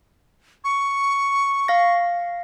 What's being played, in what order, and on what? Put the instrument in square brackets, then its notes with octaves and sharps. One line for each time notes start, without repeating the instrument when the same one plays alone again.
[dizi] C#6
[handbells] F5 A#6